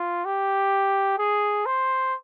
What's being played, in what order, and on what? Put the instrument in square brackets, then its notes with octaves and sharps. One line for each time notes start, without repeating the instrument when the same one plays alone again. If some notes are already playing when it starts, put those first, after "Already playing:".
Already playing: [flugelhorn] F4
G4
G#4
C5